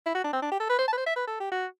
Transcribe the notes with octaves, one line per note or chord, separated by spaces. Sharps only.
E4
F#4
D4
C4
D4
G4
A4
B4
C5
A5
B4
C5
E5
B4
A4
G4
F#4